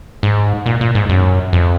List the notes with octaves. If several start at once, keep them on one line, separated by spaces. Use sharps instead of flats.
G#2
A#2
A#2
G#2
F#2
F2